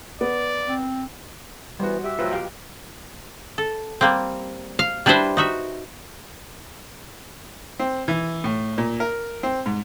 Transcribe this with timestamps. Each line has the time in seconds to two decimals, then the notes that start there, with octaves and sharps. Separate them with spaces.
0.21 B3 D5
0.68 C4
1.80 E3 G3 B3 F#4 C5
2.04 G4 E5
2.19 A1 F#3 F4 B4 C5
2.31 B1 G4 F5 G5
3.58 A4
4.01 G3 A#3 C4
4.79 F5
5.06 G3 D4 E4 B4 C5 E5
5.37 D#4 F#4 E5
7.79 C4
8.08 E3
8.44 A2
8.78 A#2
9.00 A#4
9.43 C4
9.66 G#2